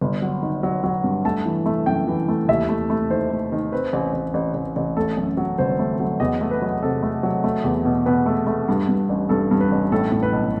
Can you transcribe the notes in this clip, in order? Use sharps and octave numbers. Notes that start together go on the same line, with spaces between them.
G1
F#3
D#3
F#3
F#3
G2
A3 A5
E3
A3
F#2 G5
E3
A3
D#2 E5
A3
A3
D#3 C5
A3
D#3
C4 B4
A1
A1
A1
A1
A1
A3 A4
F#2
F#3
G1 C5
A3
F#3
E2 D#5
A3
B4
F#3
C3 A4
A3
F#3
A3
E2
B2
B2 B4
A3
A3
G2
G2
A1
G2 A4
G2
B4
A1
A2 A4
A2
B4
B1